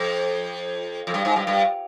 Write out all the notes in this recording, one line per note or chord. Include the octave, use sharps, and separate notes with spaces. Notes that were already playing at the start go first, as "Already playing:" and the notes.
Already playing: F2
F2
G2
G#2
G2
G2